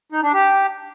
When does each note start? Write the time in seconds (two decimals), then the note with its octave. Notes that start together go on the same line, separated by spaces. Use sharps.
0.12 D#4
0.23 D4
0.34 G4